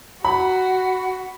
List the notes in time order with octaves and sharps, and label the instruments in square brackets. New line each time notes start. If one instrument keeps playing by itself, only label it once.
[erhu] F#4 [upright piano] B5